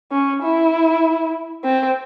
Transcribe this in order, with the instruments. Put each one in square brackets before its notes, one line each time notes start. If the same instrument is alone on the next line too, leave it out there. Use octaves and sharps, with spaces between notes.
[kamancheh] C#4
E4
C4